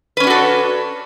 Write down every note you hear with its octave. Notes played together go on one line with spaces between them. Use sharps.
C#4 D4 F#4 A4 B4